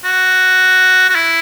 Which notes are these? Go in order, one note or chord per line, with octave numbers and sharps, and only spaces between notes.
F#4
F#4
E4